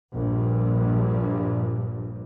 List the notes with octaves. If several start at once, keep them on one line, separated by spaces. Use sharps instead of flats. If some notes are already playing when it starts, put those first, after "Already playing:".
A#1 G2 A#2